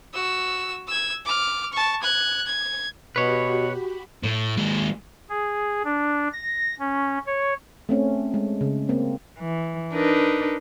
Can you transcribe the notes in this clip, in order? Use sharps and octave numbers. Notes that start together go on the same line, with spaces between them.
F#4 E6
E6 G#6
D6 F6
A5 C#6
F#6 G#6
G#6
B2 F#4 G4 B4 C#5 B5
A2
D#2 G#3
G#4
D4
A#6
C#4
C#5
A3 C4 C#4
G#3
C#3
A#3 C4
E3
D4 D#4 A#4 B4